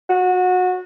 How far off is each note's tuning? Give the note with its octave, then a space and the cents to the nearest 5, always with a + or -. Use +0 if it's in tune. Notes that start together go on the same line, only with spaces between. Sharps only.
F#4 -25